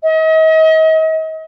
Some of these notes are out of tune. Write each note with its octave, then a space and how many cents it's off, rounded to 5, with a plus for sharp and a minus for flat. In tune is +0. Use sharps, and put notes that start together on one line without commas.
D#5 +40